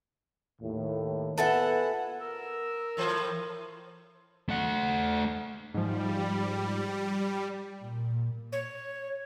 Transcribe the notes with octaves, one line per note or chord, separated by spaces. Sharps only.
D#2 A2
B3 F4 A4 B4 E5 F#5 G#5
A#4 E6
A2 E3 C5
A3 F#5
G#2 F3 G3
A#2
C#5